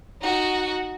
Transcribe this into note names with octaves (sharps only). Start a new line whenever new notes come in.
D#4 F#4